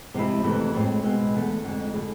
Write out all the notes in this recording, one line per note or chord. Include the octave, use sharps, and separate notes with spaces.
C3 F3 G#3 C4 E4
F2 C3 E3 A3 E4
A2 G#3 C4 G#4
B2 G#3 C4 G#4
E2 D3 A3
F2 D3 G#3
D3 A3 E4 G#4